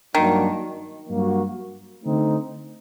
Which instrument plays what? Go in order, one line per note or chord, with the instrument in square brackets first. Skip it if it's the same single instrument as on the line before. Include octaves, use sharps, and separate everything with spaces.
[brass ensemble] G2 F#3 A#3 D4 F#4 [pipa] D#3
[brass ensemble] G2 F#3 A#3 F#4
D3 A3 C4 D#4